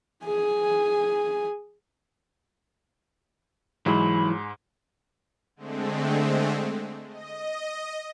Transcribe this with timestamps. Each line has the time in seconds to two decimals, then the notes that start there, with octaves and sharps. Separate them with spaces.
0.25 G#4 G#5
3.86 G#2 E3 F#3 G#3 B5
5.56 D3 G#3 A3 C4
7.10 D#5